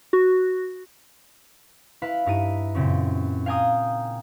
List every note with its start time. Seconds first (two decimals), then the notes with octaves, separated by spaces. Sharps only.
0.13 F#4
2.02 E4 B4 F5 B5
2.26 G2 D#4 E4 D#7
2.75 F#2 A#2 C#3 C4
3.46 F5 G5 G#5 A#5 D#6